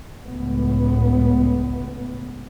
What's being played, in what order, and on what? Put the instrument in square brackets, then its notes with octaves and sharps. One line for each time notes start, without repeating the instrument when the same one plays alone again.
[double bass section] C#2 A2 B3